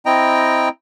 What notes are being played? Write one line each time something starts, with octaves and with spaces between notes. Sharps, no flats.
C4 E4 D#5 G5 A#5